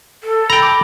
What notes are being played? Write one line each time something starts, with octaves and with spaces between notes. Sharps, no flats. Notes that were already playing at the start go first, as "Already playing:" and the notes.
A4
G5 A#5 B5
D6